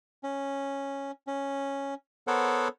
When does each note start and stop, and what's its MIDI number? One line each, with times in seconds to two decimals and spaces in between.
0.23 1.11 61
1.27 1.94 61
2.27 2.68 59
2.27 2.68 69
2.27 2.68 70
2.27 2.68 72
2.27 2.68 73
2.27 2.68 78